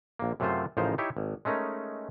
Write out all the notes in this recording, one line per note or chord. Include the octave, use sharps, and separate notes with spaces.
A#1 A#3
F#2 C3 F#3 A3 F4 C5
A1 C#3 F3 D#4 A#4 C5
D#4 E4 G4 C#5 E5
G#1
G#3 A3 C#4 D#4 A#4